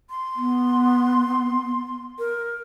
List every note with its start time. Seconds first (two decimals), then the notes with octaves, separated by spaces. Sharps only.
0.10 C6
0.36 B3
2.19 A#4